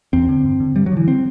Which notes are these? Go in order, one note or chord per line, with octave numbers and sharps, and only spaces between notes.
E2 C4
D3
G2
D3
G2 G3
F#3
D3 E3
C4